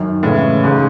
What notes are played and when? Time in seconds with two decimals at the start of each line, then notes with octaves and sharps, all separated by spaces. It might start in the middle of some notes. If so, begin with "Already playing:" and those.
Already playing: F#2 D#3
0.23 A2 C#3 E3 G#3 C#4
0.63 G#2 C#3 G#3